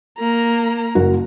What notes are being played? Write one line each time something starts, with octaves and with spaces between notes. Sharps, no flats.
A#3 A#5
F#1 F#4